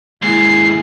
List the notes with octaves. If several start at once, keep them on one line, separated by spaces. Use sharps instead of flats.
D#2 G#2 E4 G#4 C7